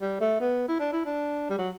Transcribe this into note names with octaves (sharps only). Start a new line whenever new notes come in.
G3
A3
B3
E4
D4
E4
D4
G3
F#3